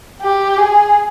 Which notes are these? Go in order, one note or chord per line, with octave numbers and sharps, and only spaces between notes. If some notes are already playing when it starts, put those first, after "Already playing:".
G4
G#4